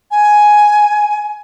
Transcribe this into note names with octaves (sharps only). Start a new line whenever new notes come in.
G#5